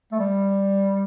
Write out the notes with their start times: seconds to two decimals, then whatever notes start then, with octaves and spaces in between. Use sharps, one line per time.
0.12 A3
0.19 G3